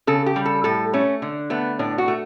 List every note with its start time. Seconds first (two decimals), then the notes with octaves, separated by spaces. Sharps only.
0.07 C#3 A4
0.26 G4
0.36 G3
0.45 A4
0.64 A2 A4
0.93 A3 C#4
1.22 D3
1.50 A3 B3
1.79 A2 D4
1.98 F#4
2.08 A3